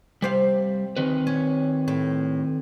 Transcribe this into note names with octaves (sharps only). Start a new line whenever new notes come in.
C3 G3 C5 F5
D#3 C4 B4
C#4
A2